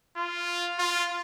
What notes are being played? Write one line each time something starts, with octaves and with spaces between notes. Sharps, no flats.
F4
F4